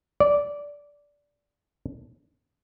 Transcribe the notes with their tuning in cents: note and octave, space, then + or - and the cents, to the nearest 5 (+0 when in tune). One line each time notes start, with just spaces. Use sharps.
D5 -15